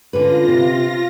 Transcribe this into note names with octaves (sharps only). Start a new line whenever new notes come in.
D3 C#4 F4 B4 A#6
C3